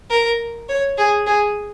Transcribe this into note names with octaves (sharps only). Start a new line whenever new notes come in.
A#4
C#5
G#4
G#4